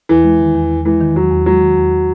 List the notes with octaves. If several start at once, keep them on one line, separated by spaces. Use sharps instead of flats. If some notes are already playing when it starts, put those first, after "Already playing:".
E2 E3
G#3
D#3
E2
E2
E3 G#3
D#3
E2 F#3
E2
F#3 G#3
D#3
E2